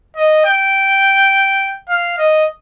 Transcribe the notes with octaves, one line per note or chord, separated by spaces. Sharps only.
D#5
G5
F5
D#5